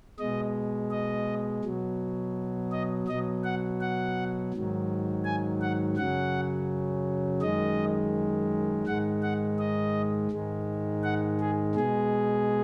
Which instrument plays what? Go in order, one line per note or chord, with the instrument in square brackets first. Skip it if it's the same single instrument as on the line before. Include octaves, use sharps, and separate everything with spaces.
[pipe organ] B2 G#3 D#5
D#5
B2 F#3
D#5
B2 F#3 D#5
F#5
F#5
G#2 D#3 F#3
G#5
F#5
F#2 C#3 F#3 F#5
F#2 D#3 G#3 D#5
G#2 D#3 G#3 F#5
F#5
D#5
G#2 D#3 G#3
F#5
G#4
B2 G#4
G#3